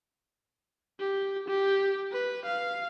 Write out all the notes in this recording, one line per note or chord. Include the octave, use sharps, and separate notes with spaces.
G4
G4
B4
F5